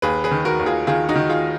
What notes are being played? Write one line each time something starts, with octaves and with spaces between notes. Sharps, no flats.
D#2 G#4 B4
G#4 B4
D#3
F#4 A#4
D#2
F4 G#4
D#3 F4 G#4
D#4 F#4
D#3
F4 G#4